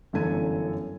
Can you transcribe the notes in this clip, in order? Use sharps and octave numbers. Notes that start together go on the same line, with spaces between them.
G1 F#2 E3 A4 G#6 D#7